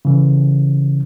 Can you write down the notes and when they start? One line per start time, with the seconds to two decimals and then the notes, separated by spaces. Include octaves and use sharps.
0.05 C#3 E3